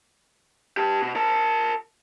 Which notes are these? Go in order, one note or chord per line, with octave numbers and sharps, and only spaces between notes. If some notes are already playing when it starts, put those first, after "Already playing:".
G4 A5
B2
A#4 A5